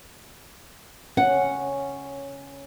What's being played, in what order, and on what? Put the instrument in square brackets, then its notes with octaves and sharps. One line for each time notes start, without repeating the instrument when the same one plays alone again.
[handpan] C#4 [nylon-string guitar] F#5